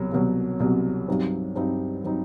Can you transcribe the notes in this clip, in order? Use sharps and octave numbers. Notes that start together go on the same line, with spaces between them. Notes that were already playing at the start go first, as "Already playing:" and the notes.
Already playing: C2 B2 F#3
C2 B2 F#3
C2 B2 F#3
G2 F#3 C4 D#4
G2 F#3 C4 D#4
F#3 C4 D#4